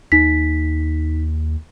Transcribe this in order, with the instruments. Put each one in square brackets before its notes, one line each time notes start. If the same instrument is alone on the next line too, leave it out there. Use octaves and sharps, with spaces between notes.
[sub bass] D#2 [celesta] D#4 B6